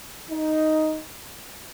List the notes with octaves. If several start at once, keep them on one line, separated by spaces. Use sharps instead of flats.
D#4